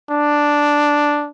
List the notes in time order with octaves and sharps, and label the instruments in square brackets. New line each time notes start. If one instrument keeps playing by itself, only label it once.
[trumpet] D4